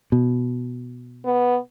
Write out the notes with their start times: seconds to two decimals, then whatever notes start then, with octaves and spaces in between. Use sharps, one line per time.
0.12 B2
1.25 B3